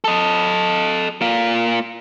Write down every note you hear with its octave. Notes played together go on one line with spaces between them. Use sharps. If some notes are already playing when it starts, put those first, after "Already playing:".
A4 D#5
A#3 F4